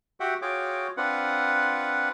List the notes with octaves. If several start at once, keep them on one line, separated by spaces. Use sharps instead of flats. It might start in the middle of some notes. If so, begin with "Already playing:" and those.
F#4 G4 E5 F#5 G5
F4 F#4 G#4 C#5 G5 D6
C4 D4 F4 B4 F#5